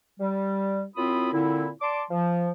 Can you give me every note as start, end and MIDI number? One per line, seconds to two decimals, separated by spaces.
0.19 0.85 55
0.96 1.30 42
0.96 1.30 60
0.96 1.30 64
0.96 1.30 65
0.96 1.30 83
0.96 1.30 87
1.32 1.70 46
1.32 1.70 50
1.32 1.70 60
1.32 1.70 64
1.81 2.03 74
1.81 2.03 81
1.81 2.03 84
1.81 2.03 86
2.10 2.51 53